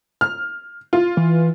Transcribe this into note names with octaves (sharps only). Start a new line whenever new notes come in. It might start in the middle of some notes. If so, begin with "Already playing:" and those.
F6
F4
E3